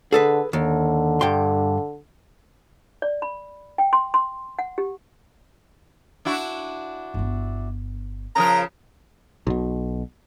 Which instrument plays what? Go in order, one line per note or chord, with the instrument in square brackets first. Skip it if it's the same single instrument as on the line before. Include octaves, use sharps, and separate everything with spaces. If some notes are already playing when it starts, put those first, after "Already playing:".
[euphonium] D3 [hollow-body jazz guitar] G#4 A4 B4
[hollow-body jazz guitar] D#2 [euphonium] D3
[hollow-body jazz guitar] G2 G5 C6
[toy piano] D5
B5
G5
C6
C6
F#5
G4
[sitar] D4 E4 F#4
[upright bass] G1 B3
[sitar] C#3 F3 A#4 [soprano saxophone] A#5
[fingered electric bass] B1 B2